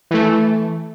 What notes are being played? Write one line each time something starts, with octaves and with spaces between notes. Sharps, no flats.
E3 A3